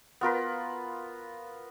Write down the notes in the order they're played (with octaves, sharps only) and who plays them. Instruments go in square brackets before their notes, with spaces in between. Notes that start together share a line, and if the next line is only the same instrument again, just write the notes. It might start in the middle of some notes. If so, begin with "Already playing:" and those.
[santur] B3 F4 A#4 B4